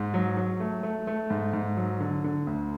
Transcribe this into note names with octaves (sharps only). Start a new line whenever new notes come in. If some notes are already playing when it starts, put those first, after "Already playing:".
Already playing: G#2
F#3
F#3
A3
A3
A3
G#2
G#2
F#3
D3
D3
D2